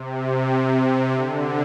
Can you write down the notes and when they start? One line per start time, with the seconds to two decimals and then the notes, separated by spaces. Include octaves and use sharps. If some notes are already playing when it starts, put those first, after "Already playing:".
Already playing: C3
1.14 D3